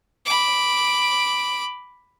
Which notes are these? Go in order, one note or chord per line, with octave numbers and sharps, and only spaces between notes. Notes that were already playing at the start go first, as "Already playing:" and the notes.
B5 D6